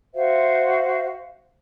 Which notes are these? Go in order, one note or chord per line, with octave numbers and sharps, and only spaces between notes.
F#4 C5 E5 F5